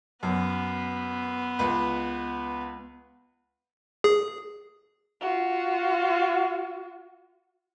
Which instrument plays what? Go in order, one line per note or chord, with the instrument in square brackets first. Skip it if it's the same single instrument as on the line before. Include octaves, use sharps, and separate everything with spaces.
[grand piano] F#2 [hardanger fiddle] B3
[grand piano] C#2 B4
[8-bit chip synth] G#4
[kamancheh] F4 F#4